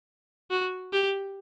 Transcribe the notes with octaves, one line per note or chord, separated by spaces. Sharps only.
F#4
G4